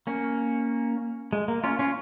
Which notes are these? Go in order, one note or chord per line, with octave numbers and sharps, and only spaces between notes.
A#3 C#4
G#3
A#3
C#4 F4
C#4 F4